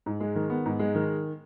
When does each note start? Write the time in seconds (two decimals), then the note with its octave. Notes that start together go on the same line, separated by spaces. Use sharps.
0.06 G#2
0.20 G#3
0.35 D#3
0.50 B3
0.66 G#2
0.79 G#3
0.95 D#3